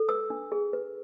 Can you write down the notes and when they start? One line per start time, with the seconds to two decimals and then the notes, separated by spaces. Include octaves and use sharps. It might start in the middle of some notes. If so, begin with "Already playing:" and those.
Already playing: A4
0.09 B4 E6
0.30 D4
0.52 G#4
0.73 B4